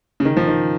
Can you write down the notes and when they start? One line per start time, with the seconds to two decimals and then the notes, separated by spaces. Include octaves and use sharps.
0.20 C#3
0.25 D#3
0.37 F3
0.47 D#3